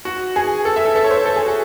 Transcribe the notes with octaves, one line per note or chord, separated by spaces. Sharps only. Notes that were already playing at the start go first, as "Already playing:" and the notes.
F#4
G#4
A4
E5
A4
A4
C#5
C5
A4
G#4
F#4